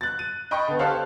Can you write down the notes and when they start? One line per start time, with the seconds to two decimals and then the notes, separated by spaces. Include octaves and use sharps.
0.01 F#6 A6
0.19 D#7
0.51 D#5 G5 B5 C#6
0.67 D3 B3
0.79 G4 A4 C5 C#5 F5 F#6